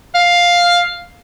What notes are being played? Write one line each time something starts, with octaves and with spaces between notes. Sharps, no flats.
F5